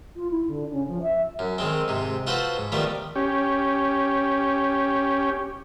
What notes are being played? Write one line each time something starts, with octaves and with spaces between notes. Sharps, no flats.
F4
E4
D3
C#3
F3
E5
F#2
D#3 G#3 C4
G#2 C3
F4 F#4 A4 B4 C5 F#5
G#2
D#3 F3 G3 A3 B3 D5
C#4 G4